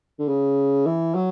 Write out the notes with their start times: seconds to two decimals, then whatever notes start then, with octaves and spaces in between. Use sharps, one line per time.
0.19 D3
0.28 C#3
0.86 E3
1.15 F#3